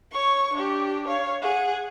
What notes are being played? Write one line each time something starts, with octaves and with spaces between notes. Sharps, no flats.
C#5 C#6
D4 G4
C#5 F5
G#4 F#5